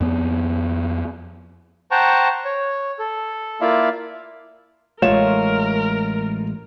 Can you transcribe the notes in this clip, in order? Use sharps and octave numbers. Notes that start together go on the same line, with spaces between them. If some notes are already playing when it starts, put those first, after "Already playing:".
F2 B3
C5 F#5 G5 A5 A#5 C#6
C#5
A4
A#3 E4 F4 D5 E5 F5
A1 G#3 A3 F4 A#4 C#5 E7